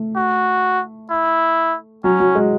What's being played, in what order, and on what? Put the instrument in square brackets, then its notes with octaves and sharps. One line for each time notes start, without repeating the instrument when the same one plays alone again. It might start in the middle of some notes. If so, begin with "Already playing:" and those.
Already playing: [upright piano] A3
[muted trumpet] F#4
E4
[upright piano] F#3 [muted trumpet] C#4
[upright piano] F#3
G#3